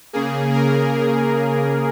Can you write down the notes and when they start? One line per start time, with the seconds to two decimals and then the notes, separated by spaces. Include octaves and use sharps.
0.13 C#3 A#3 G#4
0.53 A#4